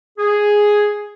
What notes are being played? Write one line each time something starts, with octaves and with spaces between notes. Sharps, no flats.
G#4